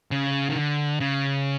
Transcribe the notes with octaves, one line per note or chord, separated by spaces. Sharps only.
C#3
D#3
D3
C#3